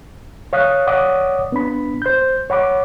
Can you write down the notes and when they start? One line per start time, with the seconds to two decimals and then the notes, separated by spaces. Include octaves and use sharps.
0.53 C#5 F5 D#6 F#6
0.87 C#5 D5 F#5 D6 D#6
1.52 B3 D4 B5
2.02 C5 G6
2.50 C#5 F#5 B5 D6